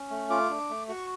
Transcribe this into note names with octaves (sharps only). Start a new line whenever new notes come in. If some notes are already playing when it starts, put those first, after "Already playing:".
Already playing: C#4
A3
F4 D6
D4
A3
F#4 C#6